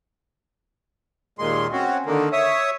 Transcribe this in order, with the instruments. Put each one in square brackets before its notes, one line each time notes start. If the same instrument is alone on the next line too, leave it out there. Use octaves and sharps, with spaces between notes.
[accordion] D#2 A#2 G#3 C6
C4 C#4 F#4
D3 D#3 A#3
C#5 E5 D#6